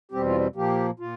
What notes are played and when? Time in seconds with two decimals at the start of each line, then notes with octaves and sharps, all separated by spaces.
0.11 E2 B2 G3 C4 G4
0.26 F4
0.55 A#2 F3 A#3 G4
0.99 A#2 F4